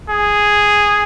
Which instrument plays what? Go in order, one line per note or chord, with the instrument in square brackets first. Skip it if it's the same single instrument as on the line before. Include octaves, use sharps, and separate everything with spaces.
[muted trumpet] G#4